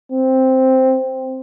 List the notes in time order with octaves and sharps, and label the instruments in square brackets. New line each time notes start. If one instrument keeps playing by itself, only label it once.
[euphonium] C4